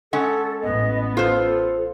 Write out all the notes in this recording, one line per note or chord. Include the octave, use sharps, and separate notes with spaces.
G#3 C#4 A4 F#5
A1 B3 D#5
F4 A4 C5